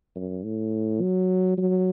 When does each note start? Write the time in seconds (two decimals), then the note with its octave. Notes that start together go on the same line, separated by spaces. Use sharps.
0.16 F#2
0.44 A2
1.01 F#3
1.58 F#3